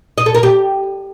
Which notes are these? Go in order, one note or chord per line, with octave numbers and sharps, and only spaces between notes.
D#5
A4
A#4
G4